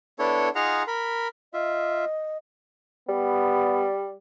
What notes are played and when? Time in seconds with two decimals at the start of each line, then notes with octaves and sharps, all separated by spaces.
0.19 B3 D4 E4 A4 C#5
0.55 D#4 F4 G#4 F5 F#5 A#5
0.87 A#4 B5
1.54 F4 D#5 E5
3.09 G3 B3